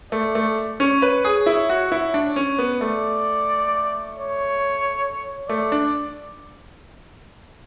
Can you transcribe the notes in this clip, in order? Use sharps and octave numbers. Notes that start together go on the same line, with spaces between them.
A3 D5
A3
C#4 C#5
B4
G#4
E4
F#4
E4
D4
C#4
B3
A3 D5
C#5
A3 D5
D4